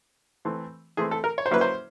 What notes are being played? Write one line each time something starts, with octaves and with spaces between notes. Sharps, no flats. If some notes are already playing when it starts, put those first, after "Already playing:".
E3 A3 C4
E3 A3 C4 G#4
A4
A#4
C#5
C5
F#3 A#3 C#4 E4 B4
C5